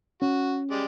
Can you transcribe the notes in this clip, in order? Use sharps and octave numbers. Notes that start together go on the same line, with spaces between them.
C#4 F#4
G#3 G4 D5